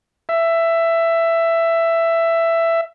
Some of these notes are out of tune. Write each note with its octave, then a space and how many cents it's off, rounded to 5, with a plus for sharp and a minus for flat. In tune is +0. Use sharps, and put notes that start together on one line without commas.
E5 +15